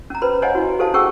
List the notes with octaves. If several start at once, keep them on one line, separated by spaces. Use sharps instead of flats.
C#4 A#5
B4 C5 B5
C5 C#5 D#5 F5 F#5 G#5
E4 F#4
G4 A4 C5 F5 A5
C#4 G#4 F#5 G5 C#6 E6